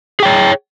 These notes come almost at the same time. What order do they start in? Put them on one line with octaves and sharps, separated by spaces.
G#4 G5 C#5